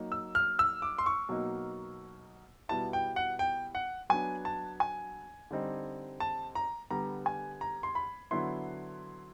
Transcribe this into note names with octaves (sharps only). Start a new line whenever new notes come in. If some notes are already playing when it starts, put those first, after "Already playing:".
Already playing: F#3 A#3 D#4
E6
F6
E6
D6
C6
C#6
B2 F#3 A#3 D#4
B2 G3 B3 E4 A5
G5
F#5
G5
F#5
F#3 B3 D4 G#5
A5
G#5
D3 G3 C4 D#4
A5
A#5
D3 G3 B3 A#5
G#5
A#5
C6
B5
D3 F#3 B3 E4 C6